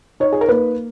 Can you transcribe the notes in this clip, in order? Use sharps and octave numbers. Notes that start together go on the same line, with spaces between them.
D#4 C#5
G#4
A#4
A#3 B4